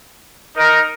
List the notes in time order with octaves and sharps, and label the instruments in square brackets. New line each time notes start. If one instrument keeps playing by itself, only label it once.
[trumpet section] D#4 A#4 D#5